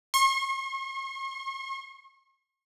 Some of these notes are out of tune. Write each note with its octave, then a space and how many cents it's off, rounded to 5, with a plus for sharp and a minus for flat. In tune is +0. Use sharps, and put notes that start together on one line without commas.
C#6 -45